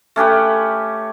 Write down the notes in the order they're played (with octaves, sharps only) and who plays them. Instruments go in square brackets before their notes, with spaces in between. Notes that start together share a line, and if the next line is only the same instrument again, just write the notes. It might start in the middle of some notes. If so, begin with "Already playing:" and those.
[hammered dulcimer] A3 C#4 G4 B4